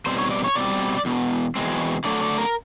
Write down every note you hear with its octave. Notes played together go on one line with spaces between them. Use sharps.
B2 G3 C4 C5
C#5
D5
C#5
B2 G3 C4 D5
E2 B2
E2 B2 G#3 C4
D3 F#3 A3 D5
D5
A#4